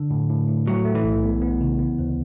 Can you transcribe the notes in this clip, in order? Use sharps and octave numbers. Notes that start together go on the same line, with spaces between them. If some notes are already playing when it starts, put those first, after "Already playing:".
Already playing: D3
A2
A2
A2
F#3 A3
A3
E3
B1
B3
B3
C#3
B3
D2